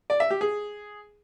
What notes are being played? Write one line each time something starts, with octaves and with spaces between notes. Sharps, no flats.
D5
E5
G4
G#4